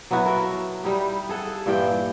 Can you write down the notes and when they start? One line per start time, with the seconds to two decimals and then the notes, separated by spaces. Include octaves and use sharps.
0.11 F#3 B3 E4 F#4
0.25 A4 A#4
0.83 G3 D#4 E4 G4
1.29 G#4 A4 F#5
1.66 G2 A#2 E3 G5